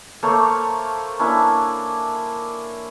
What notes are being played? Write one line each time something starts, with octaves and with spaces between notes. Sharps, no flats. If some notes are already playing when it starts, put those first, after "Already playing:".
A3 A#3 C5 C#5
A#3 C#4 D4 E4